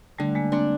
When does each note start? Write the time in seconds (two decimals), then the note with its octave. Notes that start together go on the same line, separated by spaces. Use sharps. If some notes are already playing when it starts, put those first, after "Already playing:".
0.18 D3 G3 A3
0.35 G#3 A#3
0.52 A#3 C4 D4